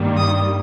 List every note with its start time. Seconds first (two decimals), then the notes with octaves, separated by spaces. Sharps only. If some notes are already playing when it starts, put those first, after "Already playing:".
Already playing: G2 D#3 G3 A#3
0.17 D#6